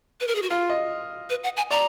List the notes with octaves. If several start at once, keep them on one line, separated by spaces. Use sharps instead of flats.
B4
A#4
G#4
F#4
F4 F5
D#5
B4
F#5
G#5
D5 A#5